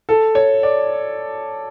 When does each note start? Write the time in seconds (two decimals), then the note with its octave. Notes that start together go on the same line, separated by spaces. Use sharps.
0.09 A4
0.35 C#5
0.63 D5